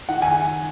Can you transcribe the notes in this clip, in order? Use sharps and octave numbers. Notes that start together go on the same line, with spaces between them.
D#3 F#5
G#5